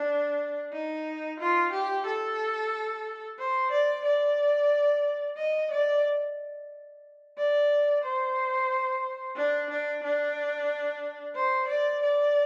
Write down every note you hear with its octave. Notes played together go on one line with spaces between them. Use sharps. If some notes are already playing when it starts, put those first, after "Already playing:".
Already playing: D4
D#4
F4
G4
A4
C5
D5
D5
D#5
D5
D5
C5
D4
D4
D4
C5
D5
D5